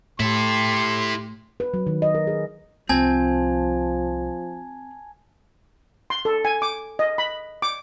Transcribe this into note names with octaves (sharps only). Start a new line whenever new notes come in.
A2 E4 G4 A4 C6
B4
F#3
D#3
D#5
A#4
G#4
C2 F3 C4 G#5 A5 G#6
C6
A4
G#5
D6
D#5
B5
D6